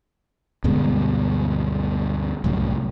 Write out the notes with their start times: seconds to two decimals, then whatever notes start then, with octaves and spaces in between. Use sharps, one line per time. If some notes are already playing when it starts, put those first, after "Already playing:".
0.64 D2 G2 B2 G#3
2.44 C2 F#2 A2